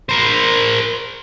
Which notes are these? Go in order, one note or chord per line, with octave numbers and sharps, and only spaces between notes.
A#4 C5